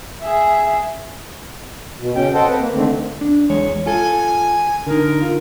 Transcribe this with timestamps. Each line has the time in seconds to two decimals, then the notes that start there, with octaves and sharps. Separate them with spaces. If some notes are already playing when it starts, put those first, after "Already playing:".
0.22 G#4 E5
2.01 B2
2.15 C#3 C#4 G5
2.34 A4 C5 D#5 F#5 G5 A5
2.48 C4 B4
2.59 A#3
2.74 D3 D#3 A3 C4
3.21 D4
3.50 E2 G#3 C#5
3.86 F4 A4 G#5
4.86 D3 D#4 A#4
5.22 F4